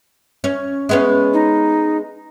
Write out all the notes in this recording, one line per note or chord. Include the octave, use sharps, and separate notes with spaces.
C#4
G#3 B3 C#4
D#4